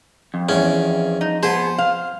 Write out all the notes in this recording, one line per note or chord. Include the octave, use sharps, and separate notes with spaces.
F2
E2 C#4
D#4
B3 G#4 C5
F5